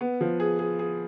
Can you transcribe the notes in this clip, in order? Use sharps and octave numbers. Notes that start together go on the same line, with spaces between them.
B3
F3
G#4
G#4
G#4